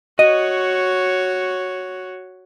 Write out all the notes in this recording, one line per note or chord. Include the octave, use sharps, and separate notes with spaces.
F#4 C#5 D#5